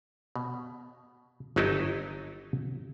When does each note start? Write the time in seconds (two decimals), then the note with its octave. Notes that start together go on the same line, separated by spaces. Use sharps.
0.36 B2
1.56 G1 F#3 D#4 E4 A4 D#5